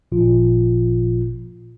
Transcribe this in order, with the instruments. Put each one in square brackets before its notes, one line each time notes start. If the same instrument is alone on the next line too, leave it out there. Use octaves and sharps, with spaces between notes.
[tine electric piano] G#1 A#2 F3 F4